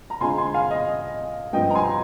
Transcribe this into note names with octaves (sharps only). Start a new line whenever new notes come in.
A#5
D3 G#3 C4 F4 G#5 C6
G#5 C6
F5 G#5
D#5
G2 F3 C4 D#5 G5
A#5
G#5 C6